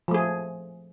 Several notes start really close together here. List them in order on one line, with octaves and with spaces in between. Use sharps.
F3 A3 G#4